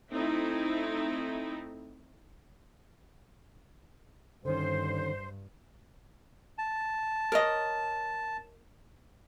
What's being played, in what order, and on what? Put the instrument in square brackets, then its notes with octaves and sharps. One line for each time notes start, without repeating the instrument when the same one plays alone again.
[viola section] A3 C4 D#4 E4
[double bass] G2 [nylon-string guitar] D3 D#3 C#4 [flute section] C5
[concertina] A5
[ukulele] A#4 C#5 D#5